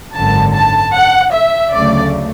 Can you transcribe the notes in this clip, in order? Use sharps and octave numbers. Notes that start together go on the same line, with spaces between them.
G#1 F#2 D3 A5
A5
F#5
E5
D2 C#3 F#3 A3 D5